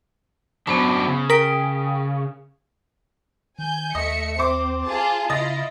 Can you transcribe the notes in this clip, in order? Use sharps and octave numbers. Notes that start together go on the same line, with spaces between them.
F#2 B3 C#4 D4 C5 B5
C#3
A#4 G5 D#6 B6 D7
D#3 G#5 G6
D#2 A3 D#5 E5 C#7
C4 C5 D6
F4 G#4 A5
C#3 E4 F4 D#5 A6